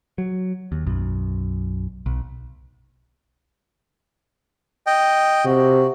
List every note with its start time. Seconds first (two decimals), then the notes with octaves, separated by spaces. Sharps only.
0.18 F#3
0.72 D#2
0.86 B1 F#2
2.06 B1
4.87 D#5 G5
5.45 C3 F#4